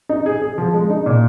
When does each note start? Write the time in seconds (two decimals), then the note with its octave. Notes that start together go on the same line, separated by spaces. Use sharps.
0.09 D#4
0.26 G#4
0.42 G#4
0.58 F3
0.74 G#3
0.90 D#4
1.06 A#2